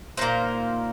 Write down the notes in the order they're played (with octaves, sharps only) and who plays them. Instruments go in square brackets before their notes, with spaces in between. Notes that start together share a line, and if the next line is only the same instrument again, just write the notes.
[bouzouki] A#2 A#3 D#4 C5